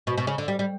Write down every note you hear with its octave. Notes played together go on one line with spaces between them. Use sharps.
B2
B2
C#3
D3
G3
G3